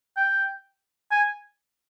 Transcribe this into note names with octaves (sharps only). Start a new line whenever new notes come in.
G5
G#5